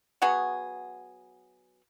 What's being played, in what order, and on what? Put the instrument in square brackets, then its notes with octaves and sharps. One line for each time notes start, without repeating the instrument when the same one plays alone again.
[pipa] F#3 B3 F#4 G#4